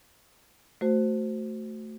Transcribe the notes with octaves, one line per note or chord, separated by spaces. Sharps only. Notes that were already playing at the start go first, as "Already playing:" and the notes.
A3 F#4 C5